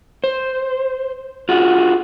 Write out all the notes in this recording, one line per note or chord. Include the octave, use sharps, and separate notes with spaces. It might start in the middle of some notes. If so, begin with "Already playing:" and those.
C5
F4 F#4 G#4